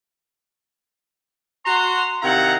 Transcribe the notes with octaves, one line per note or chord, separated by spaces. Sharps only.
F#4 A#5 C6
C3 D#3 E4 F5 F#5 A#5